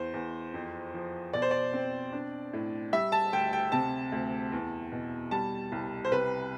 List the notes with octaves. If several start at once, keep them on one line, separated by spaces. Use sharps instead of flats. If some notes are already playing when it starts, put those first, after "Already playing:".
Already playing: E2 C5
E2
F2
F3
B2 D5
C5
D5
C4
D4
A2
G3 E5
A5
D2 G5
G5
C3 A5
D2
E2
B2
G3 A5
C2
C5
C3 B4